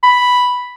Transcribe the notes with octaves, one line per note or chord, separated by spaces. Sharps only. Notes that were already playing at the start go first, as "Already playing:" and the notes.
B5